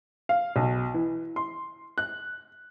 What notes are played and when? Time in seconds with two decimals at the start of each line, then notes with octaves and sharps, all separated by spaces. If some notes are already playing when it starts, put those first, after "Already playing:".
0.29 F5
0.56 B1
0.94 E3
1.36 C6
1.98 F#6